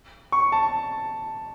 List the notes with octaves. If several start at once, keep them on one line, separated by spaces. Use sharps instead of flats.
C#6
A5